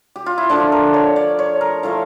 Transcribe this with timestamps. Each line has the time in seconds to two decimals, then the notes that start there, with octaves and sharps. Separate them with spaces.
0.16 G4
0.26 F4
0.38 E4
0.50 D3 F3 A3 D4
0.72 A#4
0.94 C#5
1.16 D5
1.39 C#5
1.61 A#4
1.83 A2 F3 A3 F5